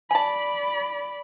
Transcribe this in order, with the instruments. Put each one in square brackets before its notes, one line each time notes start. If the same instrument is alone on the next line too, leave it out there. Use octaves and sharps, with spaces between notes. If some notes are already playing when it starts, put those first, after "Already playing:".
[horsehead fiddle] D5 B5 [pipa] G#5 A5